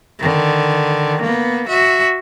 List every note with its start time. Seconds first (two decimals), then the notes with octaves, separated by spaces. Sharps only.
0.19 D3 D#3
1.22 A#3 B3
1.68 F#4 E5